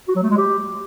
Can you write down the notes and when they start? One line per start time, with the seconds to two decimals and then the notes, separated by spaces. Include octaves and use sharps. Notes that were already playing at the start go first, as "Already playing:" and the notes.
0.08 F#4
0.15 F#3
0.23 A3
0.30 G#3
0.37 G4